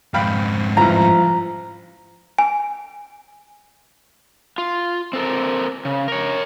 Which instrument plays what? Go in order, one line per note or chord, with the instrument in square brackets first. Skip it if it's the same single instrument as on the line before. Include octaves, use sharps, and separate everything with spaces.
[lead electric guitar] F2 G#2 [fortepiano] F5 G5 B5
[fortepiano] A1 G2 [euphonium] F3 [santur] A#5
[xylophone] G#5
[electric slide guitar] F4
C4 A4 A#4
C#3
A#4 C#5